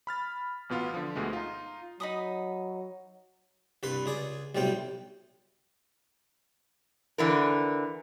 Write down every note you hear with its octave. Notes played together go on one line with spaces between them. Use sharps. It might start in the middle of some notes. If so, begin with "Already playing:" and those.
B5 F6 A6
A1 B2 B3 F4
D3 F3
D2 B2 G#3 A3
D#4 F4
F#3 D#4 B5 D#6
C2 G2 B4 B5 C6
C#2 G#4 D5
B1 A2 C3 G3 C4 G5
D3 E3 A#4